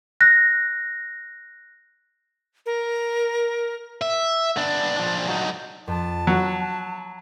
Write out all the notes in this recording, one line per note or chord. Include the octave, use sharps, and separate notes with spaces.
F#6 A#6
A#4
E5
B3 D4
F3 D4
F#3 D#4
F2 A5
F#3 F#5 B5